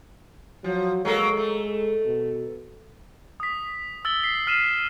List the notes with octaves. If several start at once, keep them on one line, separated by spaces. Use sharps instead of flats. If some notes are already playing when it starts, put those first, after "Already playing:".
F3 F#3
F#3 G#3 A#3 A4
A3
B2
D#6 B6
E6 A6 G7
B6 C7
F6 C7 D#7 E7